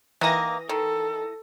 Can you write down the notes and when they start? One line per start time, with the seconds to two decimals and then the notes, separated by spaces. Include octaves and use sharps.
0.21 D#3 E3 A#3 D#6 A#6
0.69 D#3 A4